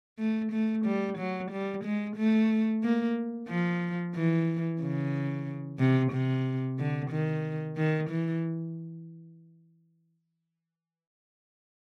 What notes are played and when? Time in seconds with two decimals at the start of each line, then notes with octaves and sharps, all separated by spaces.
0.19 A3
0.52 A3
0.86 G3
1.18 F#3
1.52 G3
1.84 G#3
2.17 A3
2.83 A#3
3.49 F3
4.15 E3
4.81 C#3
5.79 C3
6.12 C3
6.79 D3
7.11 D#3
7.77 D#3
8.10 E3